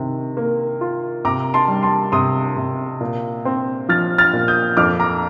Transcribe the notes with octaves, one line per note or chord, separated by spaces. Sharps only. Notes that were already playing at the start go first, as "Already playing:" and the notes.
Already playing: C3 D#3
A#3
F4
C3 A#5 D6
A5 C6
G3
A5 C6
C3 C6 D#6
C3
A#2
C4
F3 F6 A6
F6 A6
A#2
D#6 G6
F2 D6 F6
A#5 D6